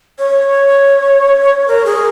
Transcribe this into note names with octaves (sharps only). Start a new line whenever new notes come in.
C#5
A#4
G#4